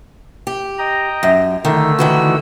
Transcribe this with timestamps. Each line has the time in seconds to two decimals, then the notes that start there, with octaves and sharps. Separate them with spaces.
0.47 G4
0.78 D#5 G5 A#5
1.23 F#2
1.65 D3 D#3 A3 E6
1.99 D#3 E3 F#4